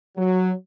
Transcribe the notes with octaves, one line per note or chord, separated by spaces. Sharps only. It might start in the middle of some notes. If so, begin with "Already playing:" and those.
F#3